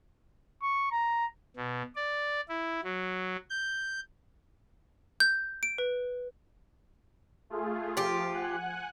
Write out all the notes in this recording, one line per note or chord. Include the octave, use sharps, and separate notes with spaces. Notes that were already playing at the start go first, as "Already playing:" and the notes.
C#6
A#5
B2
D5
E4
F#3
G6
G6
D7
B4
A3 F4 G#4
F3 F4 G4
F#5 G#5 F#6